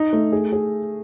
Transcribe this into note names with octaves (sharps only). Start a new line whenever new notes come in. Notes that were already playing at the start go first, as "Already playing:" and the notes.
Already playing: D#4
A3
G#4
G#4